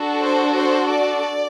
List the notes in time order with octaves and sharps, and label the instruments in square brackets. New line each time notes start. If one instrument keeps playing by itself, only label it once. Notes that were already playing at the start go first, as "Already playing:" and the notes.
Already playing: [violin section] D4 F#4 A4
C5
C5
D5